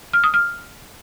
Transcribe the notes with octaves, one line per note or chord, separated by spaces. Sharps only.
F6
D#6
F6